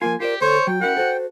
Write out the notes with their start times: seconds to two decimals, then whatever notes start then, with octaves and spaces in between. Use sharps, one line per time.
0.02 F3 A#3 F4 A#4 G#5
0.20 F4 G4 A#4 C5 D5
0.41 D2 A4 C5 C#5
0.67 F#3 F#4 G5
0.81 C#4 E4 F#4 A#4 F#5
0.97 F#4 A4 C5